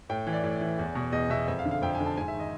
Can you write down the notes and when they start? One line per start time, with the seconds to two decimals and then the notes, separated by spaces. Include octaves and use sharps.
0.09 A2 G5
0.27 E3
0.33 D5
0.44 A2
0.61 E3
0.79 E2
0.95 B2
1.13 E2 D#5
1.30 B2 E5
1.48 F2 E5
1.59 F5
1.65 D3
1.71 F5
1.82 F2 G5
1.95 G#5
2.00 D3
2.06 A5
2.17 G#2 G#5
2.28 E5
2.34 D#3
2.40 D#5